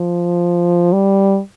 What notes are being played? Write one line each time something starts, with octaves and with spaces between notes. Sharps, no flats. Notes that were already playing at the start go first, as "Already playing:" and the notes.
Already playing: F3
G3